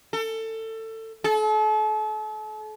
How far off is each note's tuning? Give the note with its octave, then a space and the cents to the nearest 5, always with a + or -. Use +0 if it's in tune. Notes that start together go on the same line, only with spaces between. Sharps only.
A4 +25
A4 -40